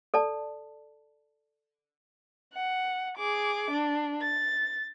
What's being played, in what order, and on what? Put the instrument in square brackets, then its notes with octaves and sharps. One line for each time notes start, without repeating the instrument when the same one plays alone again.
[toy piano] A4 D5 A5
[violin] F#5
G#4 D6
D4
A6